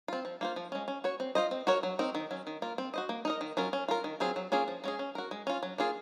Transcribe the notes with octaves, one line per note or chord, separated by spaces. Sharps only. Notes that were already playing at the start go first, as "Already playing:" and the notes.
C4 F4
F3
A#3 F4 C5
F3
G#3 C#4
C#4
F#4 C#5
C4
F4 C5 D#5
C4
F#4 A#4 C#5
F#3
C4 D#4 A#4
D#3
F#3 C#4
D#3
A#3 F4 A#4
C4
F#4 C5 D#5
A#3
D#4 A#4 D#5
D#3
F#3 C#4 F4 A#4
C#4
F4 A#4
D#3
F#3 C4 F4 G#4
F#3
A#3 C#4 F4 G#4
F3
G#3 C#4 G#4
C#4
F#4 A#4
G#3
C#4 F4
F#3
A#3 F4 G#4